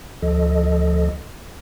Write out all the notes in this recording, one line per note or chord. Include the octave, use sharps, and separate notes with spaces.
D2 F3 A4 D#5